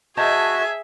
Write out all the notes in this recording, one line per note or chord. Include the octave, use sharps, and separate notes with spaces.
F#4 G#4 C5 D#5 E5 A5 G#6